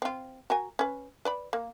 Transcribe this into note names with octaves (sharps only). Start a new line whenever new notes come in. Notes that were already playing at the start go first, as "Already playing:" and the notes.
C4 F4
F#4 A#4 G#5
C#4 B4
B4 D5 B5
A#3